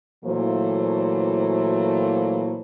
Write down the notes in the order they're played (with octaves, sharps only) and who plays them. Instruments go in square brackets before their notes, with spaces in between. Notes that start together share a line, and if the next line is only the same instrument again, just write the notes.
[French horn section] A#2 E3 F#3 A3 A#3 C5